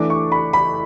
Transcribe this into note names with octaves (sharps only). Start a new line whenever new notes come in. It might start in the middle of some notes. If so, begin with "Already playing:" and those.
Already playing: E3 A3 D4 D6
C#6
B5
B5